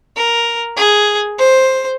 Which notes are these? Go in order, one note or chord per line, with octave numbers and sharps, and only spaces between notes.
A#4
G#4
C5